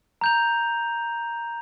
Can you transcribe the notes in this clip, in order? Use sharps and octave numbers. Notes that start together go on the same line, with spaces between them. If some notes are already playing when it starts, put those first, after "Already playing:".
A#5 G6 F7